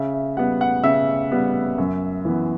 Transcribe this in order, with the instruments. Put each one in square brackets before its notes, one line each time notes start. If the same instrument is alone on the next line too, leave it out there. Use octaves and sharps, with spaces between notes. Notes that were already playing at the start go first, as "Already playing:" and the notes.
Already playing: [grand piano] C#3 E5
E5
G3 B3 F#5
F#5
C#3 E5 E6
G3 B3
F#2
E3 B3